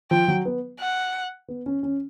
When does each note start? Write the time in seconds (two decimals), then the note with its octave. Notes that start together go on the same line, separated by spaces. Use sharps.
0.11 F3 G5
0.28 F#3
0.45 B3
0.80 F#5
1.48 B3
1.66 C#4
1.83 C#4